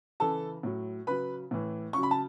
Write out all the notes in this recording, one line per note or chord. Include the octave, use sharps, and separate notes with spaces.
C#3 E3 A4 A5
A2 F#3
C#3 F#3 B4 B5
A2 E3
C#3 F#3 C#6
B5
A5